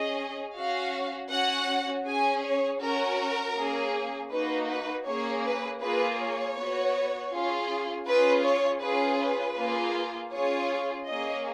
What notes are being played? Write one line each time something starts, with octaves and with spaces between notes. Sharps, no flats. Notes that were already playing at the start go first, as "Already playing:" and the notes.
Already playing: C#4 G#4 D#5
C#4 F#4 F5
C#4 F#4 F#5
C#4 G#4 G#5
C#5
C#4 F#4 A#4
A#3 C#4 G#4
A#3 D#4 F#4 B4
B4
A#3 C#4 G#4 C#5
B4
A#3 F4 G#4 B4
C#5
B3 F#4
C#4 F4 G#4
C#4 F4 G#4 B4
C#5
C#4 F4 G#4 B4
B4
A#3 F4 G#4
C#4 F4 G#4 C#5
A#3 C#4 G#4 D#5